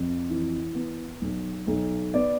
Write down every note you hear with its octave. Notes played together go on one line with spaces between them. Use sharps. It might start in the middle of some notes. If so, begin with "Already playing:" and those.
Already playing: F2
E3
B3
B1
B1
B3 D5